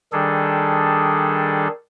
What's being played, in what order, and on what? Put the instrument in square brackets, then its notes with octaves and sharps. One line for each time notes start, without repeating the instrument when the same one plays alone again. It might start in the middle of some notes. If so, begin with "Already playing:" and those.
[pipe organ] D#3 G3 D4 G#4 A4